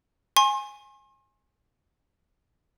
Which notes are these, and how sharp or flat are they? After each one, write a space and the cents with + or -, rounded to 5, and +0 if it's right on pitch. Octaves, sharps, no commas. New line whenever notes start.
G#5 +0 C6 +45